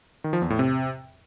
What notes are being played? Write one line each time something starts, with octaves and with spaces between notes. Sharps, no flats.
D#3
F3
E2
A2
C3